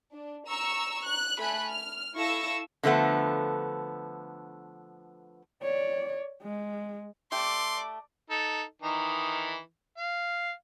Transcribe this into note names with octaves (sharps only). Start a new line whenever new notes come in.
D4
A#5 C#6 E6
F#6
A3 G#5 B5 F#6
F6
E4 A4 F5 C#6 E6 A#6
D3 F3 A3 B3
C#5 D5
G#3
A3 G4 D5 C6 D6
D#4 A4
D#3 E3 D#4
F5